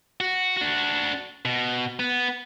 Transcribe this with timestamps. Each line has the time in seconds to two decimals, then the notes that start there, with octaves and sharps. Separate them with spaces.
0.20 F#4
0.57 D4 F#4
1.45 B2
1.99 B3